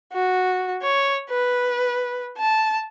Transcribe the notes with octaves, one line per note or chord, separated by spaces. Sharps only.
F#4
C#5
B4
A5